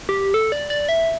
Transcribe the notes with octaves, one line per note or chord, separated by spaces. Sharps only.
G4
A4
D5
D5
E5